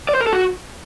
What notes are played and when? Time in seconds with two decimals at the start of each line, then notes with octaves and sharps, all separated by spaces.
0.09 D5
0.15 C5
0.21 A#4
0.27 A4
0.33 F#4